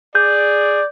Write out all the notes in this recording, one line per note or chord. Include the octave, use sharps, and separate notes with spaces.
G#4 D5 G6